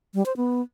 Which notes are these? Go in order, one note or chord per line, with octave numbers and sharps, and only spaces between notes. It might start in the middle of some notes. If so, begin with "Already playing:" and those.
G3
C5
B3